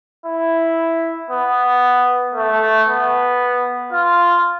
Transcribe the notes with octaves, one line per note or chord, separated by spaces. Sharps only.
E4
B3
A3
B3
F4